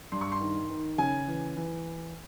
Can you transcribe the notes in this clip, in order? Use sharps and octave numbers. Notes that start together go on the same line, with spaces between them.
G2 C6
C#6
C6
D#3
D#3
C#3 G#5
E3
E3